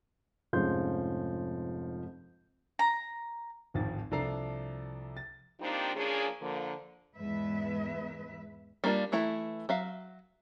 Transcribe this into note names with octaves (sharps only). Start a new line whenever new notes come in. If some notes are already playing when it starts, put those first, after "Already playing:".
F1 G#2 F3 C#4 C6 G6
A#5
D1 G#1 G#2 D#3 F3 A6
C2 F3 D4 A4 A#5 C7
A6
F3 A#3 C4 D4 D#4 G4
F3 A#3 C#4 D4 G#4
D3 F3 A#3
E2 G#2 G#3 B4 E5
G3 A#3 D4 E4 F4
E3 A3 E4 A#5
F#3 E5 F5